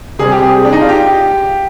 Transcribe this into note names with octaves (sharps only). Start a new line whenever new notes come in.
C3 G3 C4 G#4
G4
G#4
D4
D#4
F4
G4